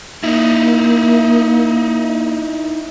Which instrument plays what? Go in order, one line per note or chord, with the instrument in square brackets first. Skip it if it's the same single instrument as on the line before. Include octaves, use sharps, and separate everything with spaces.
[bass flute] A#3 [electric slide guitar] D#4 E4